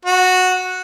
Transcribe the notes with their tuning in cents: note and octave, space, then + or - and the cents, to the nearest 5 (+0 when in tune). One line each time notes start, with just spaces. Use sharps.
F#4 -10